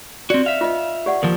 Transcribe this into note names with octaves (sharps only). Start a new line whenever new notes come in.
C4 F#4 D5
E5 F5
F4 D#5
G4 D5 F#5
D#2 F3 A#4